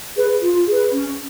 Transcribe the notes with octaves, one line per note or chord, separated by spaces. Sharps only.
G#4 B4
F4
G#4 B4
C#4